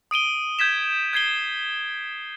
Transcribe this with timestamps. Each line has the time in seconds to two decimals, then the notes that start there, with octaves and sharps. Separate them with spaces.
0.11 D#6 D7 D#7 G7
0.59 G6 G#6 B6 E7
1.13 G6 G#6 C7 G7